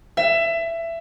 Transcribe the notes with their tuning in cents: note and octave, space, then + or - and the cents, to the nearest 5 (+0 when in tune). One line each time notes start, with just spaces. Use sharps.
E5 +20